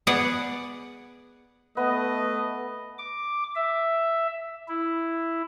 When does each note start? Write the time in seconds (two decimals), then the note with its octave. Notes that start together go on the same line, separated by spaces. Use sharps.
0.07 B3 G#4 D5 F#5
1.77 A3 B3 B4 D#5
2.98 D6
3.56 E5
4.69 E4